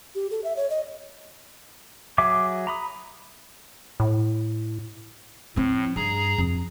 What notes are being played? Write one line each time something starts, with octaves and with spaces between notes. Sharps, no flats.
G4
A4
E5
C#5
D#5
F#3 G#4 E5 D6
A#5 B5 D#6
A2
A2 F3 C4
G2 G#4 A#5
F2